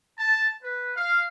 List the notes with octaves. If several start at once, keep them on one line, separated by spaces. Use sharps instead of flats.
A5
B4
F5